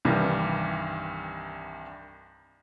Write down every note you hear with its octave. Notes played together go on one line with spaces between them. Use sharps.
C2 G2 D#3 E3 G3